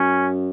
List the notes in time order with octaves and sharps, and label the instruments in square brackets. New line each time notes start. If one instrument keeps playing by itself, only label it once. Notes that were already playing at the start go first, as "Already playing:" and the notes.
Already playing: [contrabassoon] F#2 [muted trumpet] C#4